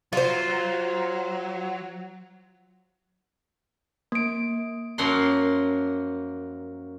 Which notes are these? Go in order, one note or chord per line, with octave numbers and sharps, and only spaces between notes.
F#3 F4 C5
A#3 D7
F#2 F3 A#3 F#5 C6